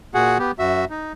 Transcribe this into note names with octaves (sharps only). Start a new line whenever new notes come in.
A#2 F#4 G#4 F#5
B3 G4
F#2 F#4 E5
D#4